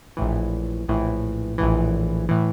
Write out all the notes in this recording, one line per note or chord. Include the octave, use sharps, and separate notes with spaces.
A#1 A2 E3
A#1 A2 E3
A#1 A2 E3
A2 E3